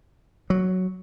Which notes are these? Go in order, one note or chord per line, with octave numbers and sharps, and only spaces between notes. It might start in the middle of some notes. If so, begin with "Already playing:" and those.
F#3